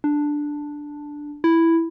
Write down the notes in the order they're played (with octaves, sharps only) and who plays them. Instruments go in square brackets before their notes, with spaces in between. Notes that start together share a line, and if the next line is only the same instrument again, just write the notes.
[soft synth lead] D4
E4